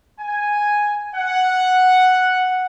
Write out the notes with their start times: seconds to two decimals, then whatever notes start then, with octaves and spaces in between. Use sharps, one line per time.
0.19 G#5
1.15 F#5